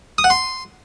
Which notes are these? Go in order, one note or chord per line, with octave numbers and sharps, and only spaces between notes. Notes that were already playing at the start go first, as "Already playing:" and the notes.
D#6
F#5
C6